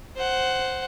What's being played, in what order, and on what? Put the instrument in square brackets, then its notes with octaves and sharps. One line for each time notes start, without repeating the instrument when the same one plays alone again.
[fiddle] C5 F#5